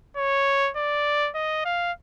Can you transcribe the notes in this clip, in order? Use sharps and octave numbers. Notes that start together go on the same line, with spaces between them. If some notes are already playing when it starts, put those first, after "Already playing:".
C#5
D5
D#5
F5